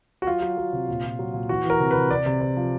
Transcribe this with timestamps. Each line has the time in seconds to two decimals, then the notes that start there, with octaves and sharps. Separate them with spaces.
0.22 F#4
0.27 F#3 F4
0.42 F#3
0.58 F#3
0.73 C3
0.88 A#2
1.04 A#2
1.19 F#3
1.34 A#2
1.49 E3 F#4
1.65 E3 A#4
1.80 C3
1.91 C3 B4
2.11 C3 D5
2.26 C3
2.41 C3
2.57 F3